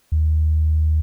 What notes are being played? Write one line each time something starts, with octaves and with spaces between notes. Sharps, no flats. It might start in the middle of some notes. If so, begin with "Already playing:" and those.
D#2